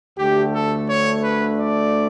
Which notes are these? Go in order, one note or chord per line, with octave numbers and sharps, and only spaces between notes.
D2 D3 A3 G4
A4
C#5
B4
D5